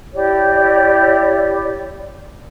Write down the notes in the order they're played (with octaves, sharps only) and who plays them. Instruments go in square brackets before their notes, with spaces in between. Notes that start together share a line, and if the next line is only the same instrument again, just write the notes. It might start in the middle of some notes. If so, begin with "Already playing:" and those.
[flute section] E4 G4 C#5 D5